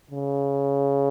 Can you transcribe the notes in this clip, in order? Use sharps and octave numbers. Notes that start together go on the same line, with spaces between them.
C#3